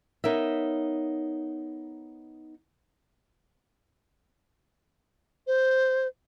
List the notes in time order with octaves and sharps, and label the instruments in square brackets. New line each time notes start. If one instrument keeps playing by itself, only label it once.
[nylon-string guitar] B3 D#4 A#4 C#5 E5
[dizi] C5